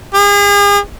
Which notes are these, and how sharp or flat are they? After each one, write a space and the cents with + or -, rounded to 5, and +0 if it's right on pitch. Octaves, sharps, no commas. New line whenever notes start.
G#4 -40